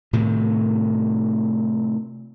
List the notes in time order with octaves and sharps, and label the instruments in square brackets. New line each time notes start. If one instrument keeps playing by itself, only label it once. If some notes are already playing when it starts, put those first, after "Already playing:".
[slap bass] A2 C3 D#3